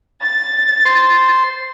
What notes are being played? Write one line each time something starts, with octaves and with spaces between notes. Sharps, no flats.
A6
C5 C6